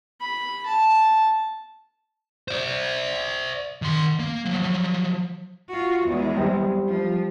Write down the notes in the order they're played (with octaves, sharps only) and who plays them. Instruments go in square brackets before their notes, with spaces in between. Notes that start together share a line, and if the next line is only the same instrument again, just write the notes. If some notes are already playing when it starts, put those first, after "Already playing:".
[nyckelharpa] B5
A5
[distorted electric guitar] C5 D5
D#3 C6
A#3
F3 F#3
[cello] F4 F#4
E2 G#3
[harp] G3 C4
[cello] F3